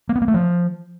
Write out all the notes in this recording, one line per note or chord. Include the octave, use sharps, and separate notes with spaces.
A#3
B3
A#3
A3
F3